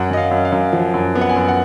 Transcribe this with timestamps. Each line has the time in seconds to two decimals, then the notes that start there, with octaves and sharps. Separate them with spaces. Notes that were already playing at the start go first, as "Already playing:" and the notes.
Already playing: F#2 F#5
0.11 F#2 D#5
0.17 F5
0.31 F#2
0.45 F5
0.52 F#2
0.73 F3
0.94 F#2
1.15 B3
1.21 F#5
1.29 G#5
1.36 F#2
1.48 F#5